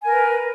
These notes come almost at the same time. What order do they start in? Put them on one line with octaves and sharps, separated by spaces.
G#5 A#4 B4